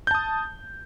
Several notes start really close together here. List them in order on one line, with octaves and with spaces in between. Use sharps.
G6 A5 D#6